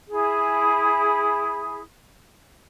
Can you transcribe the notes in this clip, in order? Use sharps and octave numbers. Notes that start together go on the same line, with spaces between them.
E4 G#4